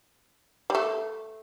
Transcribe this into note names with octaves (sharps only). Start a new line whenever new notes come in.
G3
A3